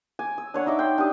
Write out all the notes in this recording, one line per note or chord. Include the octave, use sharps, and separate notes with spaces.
G#5 D6
E6
D4 C#5 F#5
D#4 D#5 E5 D6
G5 C6
D4 G4 D#6